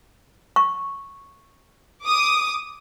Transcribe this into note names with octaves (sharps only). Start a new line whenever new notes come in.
C#6
D6 D#6